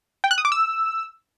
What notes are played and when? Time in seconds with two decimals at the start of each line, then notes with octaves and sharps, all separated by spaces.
0.24 G5
0.31 F#6
0.38 D#6
0.45 D6
0.52 E6